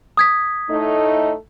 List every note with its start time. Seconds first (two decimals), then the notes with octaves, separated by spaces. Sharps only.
0.17 D#6 G#6 B6
0.70 A2 A3 D#4